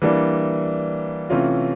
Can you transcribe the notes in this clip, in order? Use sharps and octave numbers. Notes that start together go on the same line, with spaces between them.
E3 G3 A#3 D4
C3 E3 A3 C#4 F4